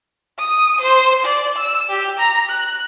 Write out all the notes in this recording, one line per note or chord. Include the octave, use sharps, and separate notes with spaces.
D#6
C5
D5
E6
G4
A#5
F#6